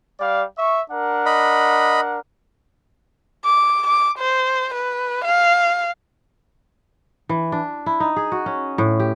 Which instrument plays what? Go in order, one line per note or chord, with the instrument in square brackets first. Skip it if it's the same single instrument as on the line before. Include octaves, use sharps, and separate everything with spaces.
[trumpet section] G3 D5 F5
E5 C#6
D4 A#4 F#5
[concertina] D#5 B5
[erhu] D6
D6
C5
B4
F5
[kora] E3
D4
E4
D#4
G#4
F#4
C#4
A2
G4